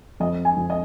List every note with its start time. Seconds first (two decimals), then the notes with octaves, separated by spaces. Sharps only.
0.20 F2 D#5
0.45 G#5
0.57 F2
0.70 D#5